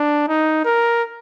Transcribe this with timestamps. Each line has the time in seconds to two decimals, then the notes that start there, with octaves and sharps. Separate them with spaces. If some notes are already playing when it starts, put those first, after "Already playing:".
Already playing: D4
0.28 D#4
0.65 A#4